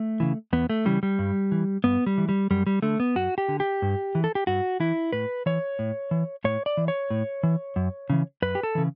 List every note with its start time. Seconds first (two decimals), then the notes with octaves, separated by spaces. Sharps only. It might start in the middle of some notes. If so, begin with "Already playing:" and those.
Already playing: A3
0.20 C#3 E3
0.53 E2 B3
0.70 A3
0.85 C#3 E3 G3
1.03 G3
1.19 G2
1.52 E3
1.84 G2 B3
2.06 G3
2.18 E3
2.29 G3
2.50 F#2 G3
2.67 G3
2.82 D3 A3
3.00 B3
3.15 F#2 F#4
3.38 G4
3.48 D3
3.60 G4
3.82 G2
4.15 E3
4.24 A4
4.35 G4
4.47 G2 F#4
4.80 E3 E4
5.13 A2 B4
5.46 E3 C#5
5.79 A2
6.11 E3
6.44 A2 C#5
6.66 D5
6.77 E3
6.88 C#5
7.10 A2
7.43 E3
7.76 F#2
8.10 C#3 E3
8.42 F#2 B4
8.55 G4
8.63 A4
8.75 C#3 E3